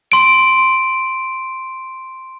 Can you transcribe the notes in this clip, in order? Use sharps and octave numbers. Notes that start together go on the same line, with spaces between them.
C6 D7